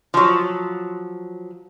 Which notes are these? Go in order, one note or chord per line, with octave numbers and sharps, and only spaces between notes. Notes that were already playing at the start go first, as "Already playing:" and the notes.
F3 F#3